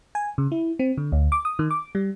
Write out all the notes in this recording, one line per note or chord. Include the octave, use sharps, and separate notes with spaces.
G#5
C#3
E4
C4
D3
D2
D6
D#6
D#3
D6
G3